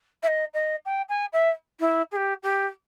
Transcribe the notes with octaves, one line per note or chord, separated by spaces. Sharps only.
E5
D#5
D#5
G5
G#5
E5
E4
G#4
G4
G4